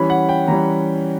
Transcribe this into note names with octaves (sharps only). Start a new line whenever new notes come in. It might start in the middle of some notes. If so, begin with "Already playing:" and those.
Already playing: E3 G3 C#4 B5
F#5
G5
E3 G3 C#4 A#5